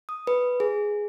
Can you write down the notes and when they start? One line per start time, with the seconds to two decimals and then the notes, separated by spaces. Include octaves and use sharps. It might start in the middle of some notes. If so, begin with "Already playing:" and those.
0.09 D#6
0.27 B4
0.60 G#4